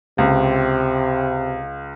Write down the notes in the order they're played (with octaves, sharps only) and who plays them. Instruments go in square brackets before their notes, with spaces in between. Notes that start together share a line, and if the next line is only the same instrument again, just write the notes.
[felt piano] C#2 [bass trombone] C3